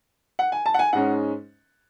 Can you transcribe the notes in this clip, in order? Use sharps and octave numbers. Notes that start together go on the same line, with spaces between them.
F#5
G#5
A5
F#5
G#5
G#2 G#3 C#4 F#5